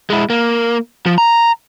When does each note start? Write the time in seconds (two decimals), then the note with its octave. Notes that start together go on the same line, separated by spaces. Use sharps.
0.10 G#3 E4
0.30 A#3
1.06 F3
1.18 A#5